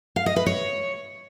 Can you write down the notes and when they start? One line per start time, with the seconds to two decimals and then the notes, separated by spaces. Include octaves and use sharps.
0.16 F5
0.26 D#5
0.36 B4
0.46 C#5